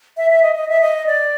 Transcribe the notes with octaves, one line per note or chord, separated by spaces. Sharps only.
E5
E5
D#5
D#5
E5
D#5
D5